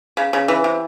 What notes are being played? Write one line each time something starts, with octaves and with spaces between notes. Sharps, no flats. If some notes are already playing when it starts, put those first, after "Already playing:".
C#3
C#3
E3
C3